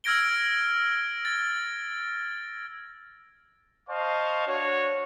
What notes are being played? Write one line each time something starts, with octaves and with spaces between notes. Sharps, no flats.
E6 F6 G#6 A#6 D7 G7
A6
C5 D#5 F5 A5 C#6
D4 F#4 C#5